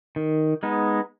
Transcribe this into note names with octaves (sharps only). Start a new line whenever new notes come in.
D#3
G#3 B3 D#4